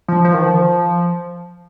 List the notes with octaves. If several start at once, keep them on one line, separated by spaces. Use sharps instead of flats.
F3
F3
D#3
F3